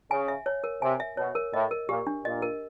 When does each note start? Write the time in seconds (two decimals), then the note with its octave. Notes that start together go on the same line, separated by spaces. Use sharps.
0.10 C#3 G#5
0.28 E5
0.46 C#5
0.64 A#4
0.82 C3 G#5
1.00 E5
1.17 B2 C#5
1.35 A#4
1.54 A2 D#5
1.71 A#4
1.89 A#2 G4
2.07 D4
2.25 A#2 D#5
2.42 A#4